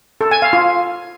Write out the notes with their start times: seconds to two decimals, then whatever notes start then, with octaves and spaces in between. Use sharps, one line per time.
0.21 A4
0.31 G#5
0.42 F5
0.53 F4